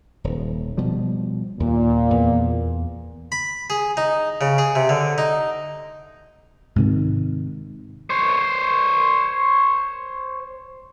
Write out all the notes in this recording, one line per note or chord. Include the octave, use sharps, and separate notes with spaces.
D#1
B2 F3 G3
D#2 A#2
E2 B3
B5
G#4
D#4
C#3
G#4
C3
D3
D#4
G#2 C3 D#3
C5 C#5